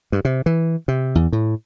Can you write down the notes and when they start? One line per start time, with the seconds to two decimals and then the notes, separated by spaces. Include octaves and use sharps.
0.12 G2
0.25 C3
0.46 E3
0.88 C3
1.15 E2
1.32 A2